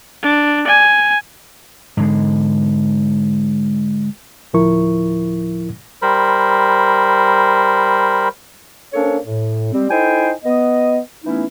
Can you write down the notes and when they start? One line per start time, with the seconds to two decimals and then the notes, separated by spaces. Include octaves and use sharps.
0.23 D4
0.67 G#5
1.97 G#2 D3 G#3
4.53 D2 A2 F3 E4 A#4 C#6
6.02 G3 A#4 C5 B5
8.94 A#3 C#4 D4 A4 C5 C#5
9.25 A2
9.73 G3 G#3 C4
9.90 D#4 E4 A4 C5 G5 G#5
10.44 B3 D#5
11.24 E3 A3 B3 C#4 D#4 E4